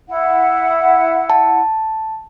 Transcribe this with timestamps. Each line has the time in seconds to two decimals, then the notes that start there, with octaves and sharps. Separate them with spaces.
0.09 E4 F#5
1.30 A5